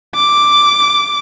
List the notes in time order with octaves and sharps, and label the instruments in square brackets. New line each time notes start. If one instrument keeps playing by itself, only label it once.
[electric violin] D6